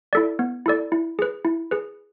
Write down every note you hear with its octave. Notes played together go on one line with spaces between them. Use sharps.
E4 A4 D5
B3
E4 A4 D5
E4
G#4 B4
E4
G#4 B4